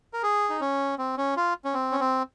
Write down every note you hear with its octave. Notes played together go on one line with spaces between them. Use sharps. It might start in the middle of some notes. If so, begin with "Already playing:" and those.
A#4
G#4
D#4
C#4
C4
C#4
F4
C#4
C4
C#4
C4